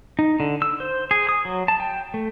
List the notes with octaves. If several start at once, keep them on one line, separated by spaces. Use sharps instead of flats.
D#4
D3
E6
C5
G#4
D#6
F#3
A5
G5
A3